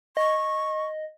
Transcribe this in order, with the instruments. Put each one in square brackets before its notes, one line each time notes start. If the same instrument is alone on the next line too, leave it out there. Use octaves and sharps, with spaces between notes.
[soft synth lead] D#5 [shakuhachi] C#6